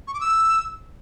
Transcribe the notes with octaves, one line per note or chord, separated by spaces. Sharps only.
C#6
D6
E6